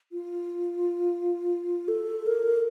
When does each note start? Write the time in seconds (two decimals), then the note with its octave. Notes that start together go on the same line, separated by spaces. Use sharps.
0.12 F4
1.88 A4
2.26 A#4